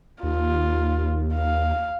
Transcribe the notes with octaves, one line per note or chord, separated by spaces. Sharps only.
D#2 F4
F5